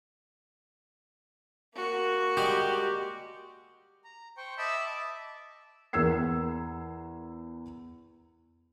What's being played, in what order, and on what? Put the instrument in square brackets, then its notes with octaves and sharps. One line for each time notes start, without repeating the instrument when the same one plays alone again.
[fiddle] A#3 F#4
[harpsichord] G3 G#3 G#4 [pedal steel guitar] G4
[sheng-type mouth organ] A#5
C5 G5 C#6
D#5 E5 A5 B5 D6 E6
E5 A5 D6
[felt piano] E2 A#4 E6 G#6 C7